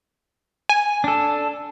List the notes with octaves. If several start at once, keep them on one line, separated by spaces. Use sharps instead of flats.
G#5
D4 A4